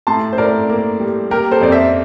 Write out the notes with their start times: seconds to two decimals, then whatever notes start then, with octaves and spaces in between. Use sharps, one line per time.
0.07 A2 A5 C6
0.33 C5
0.38 A2 A#4 D5
0.69 A#3
1.00 G3
1.31 A#3 G4 A#4
1.52 A4 C5
1.61 F2 D5
1.72 C5 E5